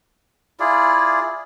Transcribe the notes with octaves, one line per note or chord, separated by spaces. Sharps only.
E4 F4 G#4 D5